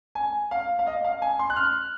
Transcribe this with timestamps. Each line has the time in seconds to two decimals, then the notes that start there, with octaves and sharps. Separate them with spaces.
0.15 G#5
0.51 F5
0.79 F5
0.87 D#5
1.04 F5
1.22 G#5
1.39 C6
1.50 F#6
1.56 F6